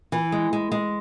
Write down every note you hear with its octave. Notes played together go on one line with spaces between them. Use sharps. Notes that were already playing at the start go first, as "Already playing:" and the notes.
E3
G#3
G#3
G#3